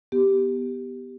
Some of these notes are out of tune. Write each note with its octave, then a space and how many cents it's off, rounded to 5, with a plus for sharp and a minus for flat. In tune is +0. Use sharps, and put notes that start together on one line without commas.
B3 +0 G4 +0